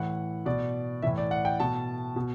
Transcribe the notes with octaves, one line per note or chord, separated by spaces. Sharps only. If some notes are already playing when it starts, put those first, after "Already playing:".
Already playing: A2 E3 F#5
B2 D5
A2 E3 E5
D5
F#5
G5
B2 A5
B2